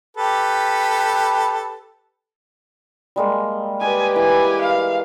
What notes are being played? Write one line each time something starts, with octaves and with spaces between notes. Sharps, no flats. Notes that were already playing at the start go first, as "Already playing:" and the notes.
G4 A4 B4
G3 G#3 A#3
G4 B4 D5 D#5 G#5
E3 G#5
F5